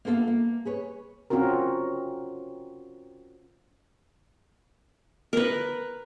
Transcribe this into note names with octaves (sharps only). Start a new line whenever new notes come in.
A#3 B3 F4 A4 C5 F5
A#3
G#4 B4 C#5
C4 C#4 F4 F#4 A#4
A#4 B4